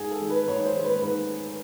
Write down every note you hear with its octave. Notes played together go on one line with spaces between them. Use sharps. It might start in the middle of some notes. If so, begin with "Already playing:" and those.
Already playing: G#2 G#4
A4
D#3 G#3
B4
G#2 C#5
C5
D#3 G#3
B4
G#2 B4